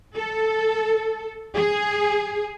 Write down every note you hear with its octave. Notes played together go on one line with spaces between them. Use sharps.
A4
G#4